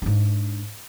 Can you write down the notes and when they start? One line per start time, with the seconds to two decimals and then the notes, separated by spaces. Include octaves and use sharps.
0.02 G#2 D4